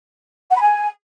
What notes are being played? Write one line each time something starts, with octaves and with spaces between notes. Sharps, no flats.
F#5
B5
G#5